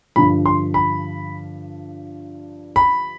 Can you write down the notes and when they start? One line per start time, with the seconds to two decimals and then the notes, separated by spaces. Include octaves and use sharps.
0.16 G2 D3 F3 B5
0.46 C6
0.74 B5
2.76 B5